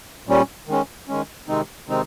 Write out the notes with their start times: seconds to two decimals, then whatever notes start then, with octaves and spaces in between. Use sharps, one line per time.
0.27 A#2 G3 C#4
0.67 D#3 G#3 C#4
1.08 D#3 G#3 C#4
1.48 C3 D#3 G#3 C4 D#4
1.88 C3 D#3 G#3 C4 D#4